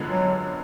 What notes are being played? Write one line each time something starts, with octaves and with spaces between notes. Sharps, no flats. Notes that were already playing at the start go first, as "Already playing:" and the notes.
Already playing: F#2 D3 F3 G#3 B3
F#3